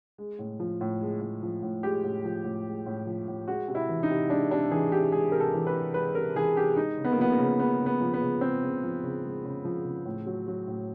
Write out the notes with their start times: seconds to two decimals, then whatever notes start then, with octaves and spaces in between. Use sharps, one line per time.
0.18 G#3
0.39 A2
0.60 F3
0.81 A2
1.01 G#3
1.21 A2
1.43 F3
1.63 A2
1.83 G#3 G4
2.04 A2
2.25 F3
2.44 A2
2.66 G#3
2.86 A2
3.07 F3
3.28 A2
3.48 G#3 F#4
3.68 C3
3.75 E4
3.89 E3
4.03 D#4
4.10 C3
4.30 G#3 D4
4.51 C3 D4
4.71 E3 G#4
4.92 C3 G4
5.12 G#3 G#4
5.32 C3 A#4
5.40 A4
5.54 E3
5.67 B4
5.74 C3
5.94 G#3 B4
6.15 C3 A#4
6.36 E3 G#4
6.56 C3 G4
6.77 G#3 D#4
6.98 C#3
7.05 B3
7.12 A#3
7.18 F3 B3
7.32 A#3
7.38 C#3
7.59 G#3 B3
7.79 C#3
7.86 B3
8.01 F3
8.14 B3
8.21 C#3
8.41 G#3 C4
8.62 C#3
8.83 F3
9.03 C#3
9.24 G#3
9.45 C#3
9.65 F3
9.85 C#3
10.05 A2
10.26 F#3
10.48 F#3
10.68 A2